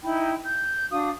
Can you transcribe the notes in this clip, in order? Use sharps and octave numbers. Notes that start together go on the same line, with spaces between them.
D#4 E4 G5 B5
G6
D4 F#4 F5 D#6